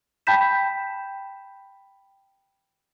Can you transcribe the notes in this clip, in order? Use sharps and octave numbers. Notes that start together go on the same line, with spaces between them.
G5 A5 B5 G6 B6 E7